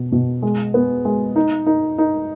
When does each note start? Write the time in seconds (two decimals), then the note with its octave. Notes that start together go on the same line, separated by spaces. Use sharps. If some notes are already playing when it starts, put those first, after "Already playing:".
Already playing: B2
0.12 B2
0.42 G#3
0.74 B3
1.05 G#3
1.36 D#4
1.67 D#4
1.98 D#4